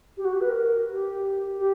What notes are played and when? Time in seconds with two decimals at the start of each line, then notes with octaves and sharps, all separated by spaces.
0.17 G4
0.25 F#4
0.33 G4
0.41 B4
0.49 A#4
0.91 G4
1.59 G4